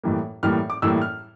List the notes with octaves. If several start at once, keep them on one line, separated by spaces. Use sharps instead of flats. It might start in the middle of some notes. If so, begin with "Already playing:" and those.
A2 E3 G3 A#3
A2 E3 G3 A#3 F6
D6
A2 E3 G3 A#3 E6
F6